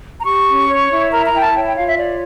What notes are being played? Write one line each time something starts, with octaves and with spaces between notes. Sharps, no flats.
A#5
G4 C#6
C#4
C#5
E4
A#4 A#5
A#5
E4 G5
A5
C#5 G5
G5
F4 F5
E5
C#5 D5